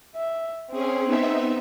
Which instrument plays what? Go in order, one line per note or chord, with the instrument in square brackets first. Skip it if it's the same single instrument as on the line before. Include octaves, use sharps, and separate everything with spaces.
[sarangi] E5
[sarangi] C4 [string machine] C#4 G#4
[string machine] B3 D#4 E5